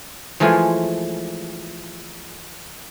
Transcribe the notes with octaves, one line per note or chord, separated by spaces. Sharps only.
E3 F3 G#3 A3 F4 G#5